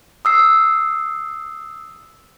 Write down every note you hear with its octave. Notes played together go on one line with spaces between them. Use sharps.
D#6 E6 C7